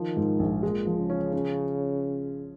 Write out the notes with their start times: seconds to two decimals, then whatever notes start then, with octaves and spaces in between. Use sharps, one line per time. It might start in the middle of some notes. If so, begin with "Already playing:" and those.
Already playing: D#3 F3
0.17 G#2
0.39 A#1
0.63 A#2 G#3
0.86 F3
0.98 C#3
1.10 C#4
1.33 C#4